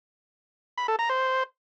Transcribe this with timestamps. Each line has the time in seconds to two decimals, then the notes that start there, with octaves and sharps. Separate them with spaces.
0.78 B5
0.88 A4
0.99 A#5
1.10 C5